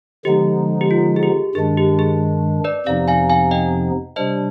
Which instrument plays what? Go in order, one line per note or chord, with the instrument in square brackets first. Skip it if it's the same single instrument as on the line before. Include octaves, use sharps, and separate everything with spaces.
[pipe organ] D3 F3 G#3 B3 D#4 [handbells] G4
[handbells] G4
F4
G#4
G4
[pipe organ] G2 D#3 G#3 D4 [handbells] G#4
[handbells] G4
G#4
B4 D5
[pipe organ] F2 C3 F3 B3 D#4 [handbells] D5 F5
[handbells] F5 G#5
F5 G#5
D#5 G5
[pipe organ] C3 G3 D4 [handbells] C5 D#5